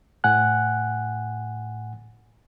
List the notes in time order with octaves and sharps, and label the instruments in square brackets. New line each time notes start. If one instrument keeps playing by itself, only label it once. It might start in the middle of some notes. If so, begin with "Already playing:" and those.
[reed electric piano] A2 F#5 G#5 F#6